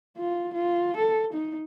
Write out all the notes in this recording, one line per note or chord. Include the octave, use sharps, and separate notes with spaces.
F4
F4
A4
D#4